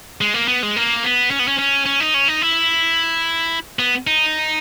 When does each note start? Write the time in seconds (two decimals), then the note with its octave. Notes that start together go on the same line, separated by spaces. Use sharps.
0.21 G#3
0.34 A#3
0.48 B3
0.63 G#3
0.76 A#3
1.04 B3
1.31 C#4
1.39 B3
1.48 C#4
1.59 C#4
1.86 C#4
2.00 D#4
2.14 C#4
2.28 D#4
2.42 E4
3.79 B3
4.07 D#4